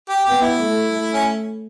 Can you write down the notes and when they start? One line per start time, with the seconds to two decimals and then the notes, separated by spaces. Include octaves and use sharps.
0.09 G4
0.25 B3 G4
0.42 E4
0.58 A3
0.91 A3
1.14 C#4